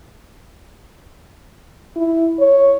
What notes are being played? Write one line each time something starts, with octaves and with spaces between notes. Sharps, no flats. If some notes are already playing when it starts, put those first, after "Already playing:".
E4
C#5